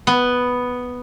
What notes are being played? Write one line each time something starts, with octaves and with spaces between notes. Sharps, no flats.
B3